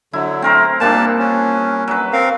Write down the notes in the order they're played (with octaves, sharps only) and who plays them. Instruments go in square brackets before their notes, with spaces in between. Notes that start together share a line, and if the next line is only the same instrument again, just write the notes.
[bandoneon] D3 F#3 [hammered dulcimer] E4
[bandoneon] A3 [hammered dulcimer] C4 A#4 C5
[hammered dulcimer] A#2 G3 D4 [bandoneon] A#3 A5
[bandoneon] C#4
[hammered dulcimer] F#3 B4
[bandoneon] C4 A#4 F5